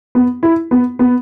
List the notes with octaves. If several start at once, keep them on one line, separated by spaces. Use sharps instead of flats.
B3
E4
B3
B3